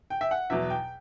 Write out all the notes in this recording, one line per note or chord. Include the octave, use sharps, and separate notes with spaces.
G5
E5
F#5
E2 B2 F#3 E5
G5